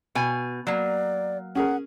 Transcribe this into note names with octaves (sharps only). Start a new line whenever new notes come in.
B2 G#5
F#3 A#3 D5
C#4 G#4 A#4 F#5